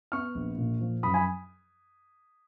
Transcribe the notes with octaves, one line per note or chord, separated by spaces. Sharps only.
B3 C#6 F6
A#1
A#2
F3
F#2 B5 D#6
G#5 B5